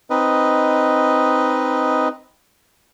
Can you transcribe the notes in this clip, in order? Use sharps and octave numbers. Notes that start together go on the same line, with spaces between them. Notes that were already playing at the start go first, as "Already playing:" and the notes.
C4 D#4 B4 D#5